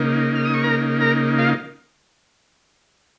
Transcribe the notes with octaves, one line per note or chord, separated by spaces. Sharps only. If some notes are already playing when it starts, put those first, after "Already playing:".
Already playing: C#3 A#3 D#4
F6
D#6
C#6
A#4 A#5
A#4 A#5
F4 F5